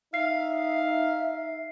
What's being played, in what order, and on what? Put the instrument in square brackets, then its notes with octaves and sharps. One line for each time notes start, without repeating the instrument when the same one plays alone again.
[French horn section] D#4 [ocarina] E5 [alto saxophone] F5 [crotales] C7